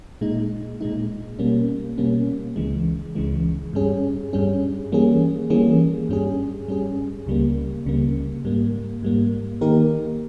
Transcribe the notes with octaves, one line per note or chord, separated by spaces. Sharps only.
A#2 G#3 D#4
A#2 G#3 D#4
B2 G3 A#3 C#4
B2 G3 A#3 C#4
C#2 C#3 E3 G#3
C#2 C#3 E3 G#3
G2 G3 C#4 G#4
G2 G3 C#4 G#4
E3 G3 A#3 C#4 G#4
E3 G3 A#3 C#4 G#4
G2 G3 C#4 G#4
G2 G3 C#4 G#4
C#2 C#3 G3 A#3
C#2 C#3 G3 A#3
G#2 G3 A#3
G#2 G3 A#3
D#3 A#3 D#4 G4 A#4